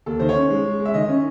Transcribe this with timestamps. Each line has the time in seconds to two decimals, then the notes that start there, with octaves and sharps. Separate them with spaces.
0.06 D#2 A4
0.20 D#3 C5
0.29 C#5
0.36 C#4
0.50 G#3
0.65 G#3
0.79 G#3
0.85 E5
0.94 D#3 D#5
1.08 C#4